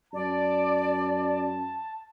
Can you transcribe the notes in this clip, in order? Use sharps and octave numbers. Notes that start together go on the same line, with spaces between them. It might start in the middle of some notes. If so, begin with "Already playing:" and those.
F#2 D5 A5